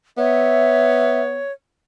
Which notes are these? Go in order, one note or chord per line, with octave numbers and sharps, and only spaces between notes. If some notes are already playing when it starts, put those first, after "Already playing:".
B3 C#5 E5